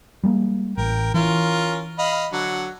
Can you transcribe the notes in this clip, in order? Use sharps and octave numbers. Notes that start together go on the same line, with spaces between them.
G3 G#3 A#3
A1 A#4 G5
E3 C#4 F4 A#4
D#5 F5 B5
D3 F#3 F#5